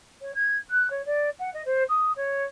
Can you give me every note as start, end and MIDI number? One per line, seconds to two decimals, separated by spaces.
0.21 0.32 73
0.35 0.57 92
0.70 0.89 90
0.90 1.02 73
1.06 1.30 74
1.39 1.52 78
1.54 1.62 75
1.66 1.84 72
1.89 2.12 87
2.17 2.45 73